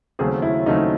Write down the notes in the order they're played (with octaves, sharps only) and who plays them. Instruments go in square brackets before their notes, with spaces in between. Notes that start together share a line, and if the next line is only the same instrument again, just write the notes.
[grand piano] D#2 C#3 F#3 A3 C4 [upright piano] G#4
[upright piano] E4
[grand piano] D#2 C#3 F#3 A3 C4 [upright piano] D#4